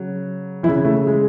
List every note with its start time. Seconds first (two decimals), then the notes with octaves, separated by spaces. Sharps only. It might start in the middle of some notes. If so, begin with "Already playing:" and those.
Already playing: C#3 F#3
0.63 E3 E4
0.69 C#3
0.85 A3
1.07 G#3